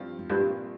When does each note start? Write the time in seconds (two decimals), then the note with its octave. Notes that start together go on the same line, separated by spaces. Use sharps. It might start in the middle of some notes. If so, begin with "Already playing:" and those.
Already playing: G2 F3 C4 F4
0.19 F2
0.29 A#1 G2 A#2 G3 C4